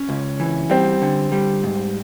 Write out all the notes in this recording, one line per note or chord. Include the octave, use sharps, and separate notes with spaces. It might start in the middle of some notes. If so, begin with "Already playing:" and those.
Already playing: C#4
C#2
E3
G3 C4
D3
G3
G#2